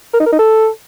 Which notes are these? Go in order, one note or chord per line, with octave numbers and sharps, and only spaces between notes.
A#4
D#4
A#4
D#4
A4